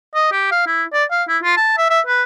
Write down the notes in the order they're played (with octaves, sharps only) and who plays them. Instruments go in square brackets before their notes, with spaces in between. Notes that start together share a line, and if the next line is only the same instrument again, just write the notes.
[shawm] D#5
G4
F5
E4
D5
F5
E4
F4
A5
E5
E5
B4